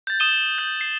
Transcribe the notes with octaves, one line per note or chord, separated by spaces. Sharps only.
G6 A6
D#6 D#7 E7 G7
G6 F#7
C7